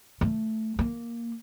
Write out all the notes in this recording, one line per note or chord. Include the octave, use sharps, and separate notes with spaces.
A3
A#3